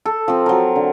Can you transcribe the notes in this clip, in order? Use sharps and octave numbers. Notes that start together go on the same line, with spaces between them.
A4
F3 C4
F#3 A#4
D3